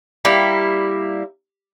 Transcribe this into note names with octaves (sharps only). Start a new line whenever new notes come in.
G3 A#3 E4